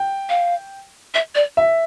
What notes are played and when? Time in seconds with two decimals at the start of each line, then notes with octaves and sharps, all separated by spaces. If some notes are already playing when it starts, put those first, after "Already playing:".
Already playing: G5
0.29 F5
1.14 E5
1.35 D5
1.57 E5